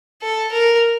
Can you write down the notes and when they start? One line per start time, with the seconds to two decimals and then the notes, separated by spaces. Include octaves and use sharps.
0.23 A4
0.51 A#4